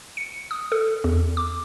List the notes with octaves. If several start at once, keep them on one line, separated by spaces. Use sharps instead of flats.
C#7
D#6
A4
E2
D6